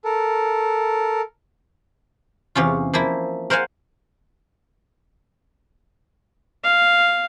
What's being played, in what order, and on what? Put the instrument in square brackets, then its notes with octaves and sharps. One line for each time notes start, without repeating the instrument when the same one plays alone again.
[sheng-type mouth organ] A4 A#4
[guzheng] E2 C3 C#4 F4
F3 A#3 E4
A#4 C5 F5 F#5 G#5
[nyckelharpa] F5